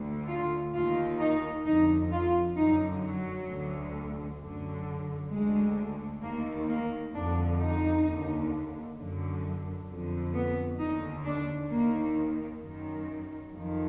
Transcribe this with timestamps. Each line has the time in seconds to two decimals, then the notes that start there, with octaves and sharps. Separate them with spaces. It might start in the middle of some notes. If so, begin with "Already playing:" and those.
Already playing: D2 D3
0.28 F4
0.74 D#2 D#3 F4
1.19 D#4
1.65 F2 D3 D#4
2.11 F4
2.56 F#2 D3 D#4
3.03 F#3
3.48 D2 D3
4.39 F#2 D3
5.30 D2 D3 G#3
6.22 D#2 D#3 A#3
6.68 A#3
7.13 F2 D3 D4
7.59 D#4
8.04 D#2 D3
8.96 F#2 D3
9.88 F2 D3
10.34 B3
10.78 D#2 D3 D#4
11.24 D4
11.70 D#2 D#3 A#3
12.62 F#2 D#3
13.53 F2 D#3